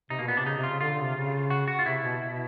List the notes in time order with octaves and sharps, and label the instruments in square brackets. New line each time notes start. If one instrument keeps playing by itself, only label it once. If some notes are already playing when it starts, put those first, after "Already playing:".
[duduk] C3 [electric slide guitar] D#4
[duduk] B2 [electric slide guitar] A#3
[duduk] A#2 [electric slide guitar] B3
[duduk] C3 [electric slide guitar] D4
[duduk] C#3 [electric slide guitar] D#4
[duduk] C3
[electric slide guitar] F4
[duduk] C#3
[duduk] D3 [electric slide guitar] F4
[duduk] D3
C3
C#3
[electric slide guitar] F#4
F#4
F4
[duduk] C3 [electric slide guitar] E4
[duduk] B2
B2